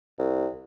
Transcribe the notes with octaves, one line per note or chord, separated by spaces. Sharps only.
C2